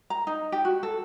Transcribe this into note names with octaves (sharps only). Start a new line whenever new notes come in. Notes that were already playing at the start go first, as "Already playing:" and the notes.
A#5
D#4
G4
F#4
A4